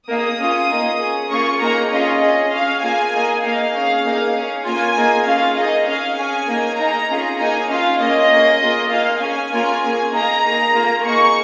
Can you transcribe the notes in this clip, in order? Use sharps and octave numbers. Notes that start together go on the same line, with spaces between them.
A#3 D#4 G#4 D#6
C#4 F4 G#4
A#3 D#4 G#4
C#4 G#4
A#3 C#4 F4 G#4 C#6
A#3 D#4 G#4 A#5
C#4 F4 G#4 D#5
C#4 G#4
C#4 G#4 F5
A#3 F4 G#4 G#5
A#3 D#4 G#4
A#3 D#4 G#4 F5
C#4 G#4
A#3 D#4 G#4
C#4 G#4
A#3 C#4 F4 G#5
A#3 D#4 G#4
C#4 F4 G#4 F5
A#3 D#4 G#4 D#5
C#4 G#4 F5
C#4 G#4 G#5
A#3 D#4 G#4
A#3 D#4 G#4 A#5
C#4 F4 G#4
A#3 D#4 G#4 G#5
C#4 F4 G#4 F5
A#3 C#4 F4 G#4 D#5
A#3 C#4 G#4
A#3 F4 G#4
A#3 D#4 G#4 F5
C#4 G#4 G#5
A#3 C#4 F4 G#4
A#3 C#4 G#4
A#3 D#4 G#4 A#5
A#3 D#4 G#4
A#3 F4 G#4
A#3 D#4 G#4 C#6